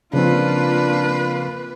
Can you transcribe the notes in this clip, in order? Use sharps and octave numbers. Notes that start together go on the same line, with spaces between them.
C#3 F3 A#3 C4 D4 F4 B4